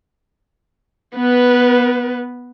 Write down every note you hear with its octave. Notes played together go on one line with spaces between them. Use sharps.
B3 B4